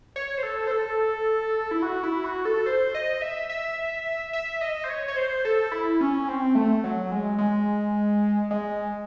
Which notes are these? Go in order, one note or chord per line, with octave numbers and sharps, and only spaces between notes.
C#5
C5
A4
C5
A4
E4
F#4
E4
F#4
A4
C5
D#5
E5
E5
E5
D#5
C5
C#5
C#5
C5
A4
E4
C#4
C4
A3
F#3
G#3
G#3
G#3